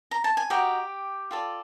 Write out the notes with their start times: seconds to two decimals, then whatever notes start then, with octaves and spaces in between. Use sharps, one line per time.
0.11 A#5
0.24 A5
0.37 G#5
0.50 F#4 G4 A#4 D#5 G5
1.31 F4 A4 D5